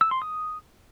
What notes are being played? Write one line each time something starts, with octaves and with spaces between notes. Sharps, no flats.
E6
C6
D#6